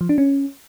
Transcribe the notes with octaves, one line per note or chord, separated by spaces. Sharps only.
F3
D4
C#4